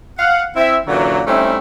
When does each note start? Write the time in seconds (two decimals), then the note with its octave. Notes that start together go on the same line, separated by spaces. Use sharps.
0.18 F5 F#5
0.57 C4 E4 E5
0.87 F#2 A#2 D3 E3 F#3
1.26 G3 A3 C4 C#4 D#4 E4